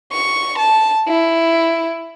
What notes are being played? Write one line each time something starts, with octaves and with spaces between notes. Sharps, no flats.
C#6
A5
E4